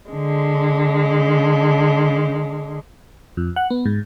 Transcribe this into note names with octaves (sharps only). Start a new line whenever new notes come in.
D3 G#3
F2
F#5
B3
G#2